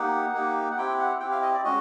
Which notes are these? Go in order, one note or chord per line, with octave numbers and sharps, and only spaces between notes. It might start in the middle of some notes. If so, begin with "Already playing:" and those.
Already playing: A#3 D#4 G4 F#5
A#3 D#4 G4
F#5
C4 E4 G4 G5
F#5
C4 E4 G4 G5
F5
D#5
D5
G#3 C#4 F#4 D#5